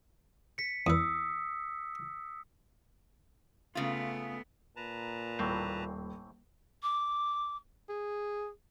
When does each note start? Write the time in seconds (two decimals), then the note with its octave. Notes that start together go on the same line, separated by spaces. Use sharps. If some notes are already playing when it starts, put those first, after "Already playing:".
0.58 B6 C#7
0.87 E2 B4 D#6 E6
3.75 C#3 A3 B3 F4
4.76 A#2 B4 A5 A#5
5.39 D#1 A2 E3 C4
6.82 D6
7.89 G#4